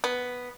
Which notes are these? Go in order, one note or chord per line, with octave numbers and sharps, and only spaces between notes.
B3